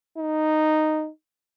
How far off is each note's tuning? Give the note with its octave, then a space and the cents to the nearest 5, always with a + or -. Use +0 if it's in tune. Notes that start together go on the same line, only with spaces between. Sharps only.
D#4 -5